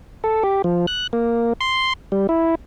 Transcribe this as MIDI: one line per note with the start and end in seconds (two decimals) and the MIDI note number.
0.24 0.43 69
0.43 0.62 67
0.64 0.86 53
0.87 1.07 90
1.13 1.53 58
1.61 1.93 84
2.12 2.27 55
2.29 2.55 64